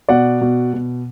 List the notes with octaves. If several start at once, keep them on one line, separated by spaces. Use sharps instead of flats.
B2 D5 F#5
B2
B2